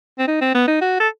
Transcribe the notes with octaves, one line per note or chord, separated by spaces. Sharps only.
C4
D#4
C4
B3
D#4
F#4
A4